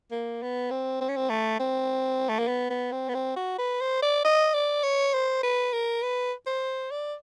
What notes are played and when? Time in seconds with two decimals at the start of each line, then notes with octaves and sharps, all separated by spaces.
0.12 A#3
0.42 B3
0.71 C4
1.01 C4
1.09 C#4
1.16 C4
1.30 A3
1.60 C4
2.29 A3
2.39 A#3
2.47 B3
2.70 B3
2.92 C4
3.09 B3
3.15 C4
3.37 F#4
3.58 B4
3.81 C5
4.03 D5
4.25 D#5
4.54 D5
4.83 C#5
5.14 C5
5.43 B4
5.73 A#4
6.02 B4
6.47 C5
6.91 D5